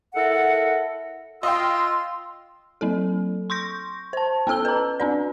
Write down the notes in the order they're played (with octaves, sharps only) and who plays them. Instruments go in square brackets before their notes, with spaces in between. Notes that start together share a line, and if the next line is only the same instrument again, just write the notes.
[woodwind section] E4 A4 A#4 F#5
[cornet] F4 [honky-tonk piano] D#5 F5 G5 [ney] C6 [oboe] E6
[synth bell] F#3 C4 A4
C6 C#6 G6 A#6
C5 A5
B3 C#4 A4 E6 G7
B4 A#5
C4 D4 D5